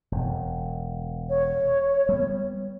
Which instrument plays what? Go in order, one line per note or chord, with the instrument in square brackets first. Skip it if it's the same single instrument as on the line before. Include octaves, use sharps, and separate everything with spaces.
[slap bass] E1
[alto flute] C#5
[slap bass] G3 B3